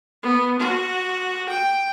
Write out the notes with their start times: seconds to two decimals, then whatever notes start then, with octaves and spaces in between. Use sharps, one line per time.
0.23 B3
0.59 F#4
1.49 G5